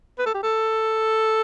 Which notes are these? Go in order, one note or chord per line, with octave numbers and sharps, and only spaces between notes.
B4
A4
G4
A4